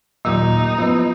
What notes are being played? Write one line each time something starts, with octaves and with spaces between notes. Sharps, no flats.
D#2 A#2 F#3 D#4 G4
F3 B3 E4